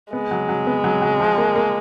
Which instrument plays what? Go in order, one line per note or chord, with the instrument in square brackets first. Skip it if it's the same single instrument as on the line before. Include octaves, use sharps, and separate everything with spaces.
[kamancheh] G#3 [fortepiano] B3
[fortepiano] F#3
F#3
B3
F#3
F#3
F3
A#3
A#3